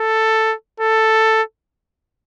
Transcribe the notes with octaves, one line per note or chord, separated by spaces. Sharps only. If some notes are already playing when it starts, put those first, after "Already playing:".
Already playing: A4
A4